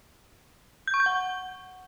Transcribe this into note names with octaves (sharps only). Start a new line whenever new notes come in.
G6
C#6
G6
F#5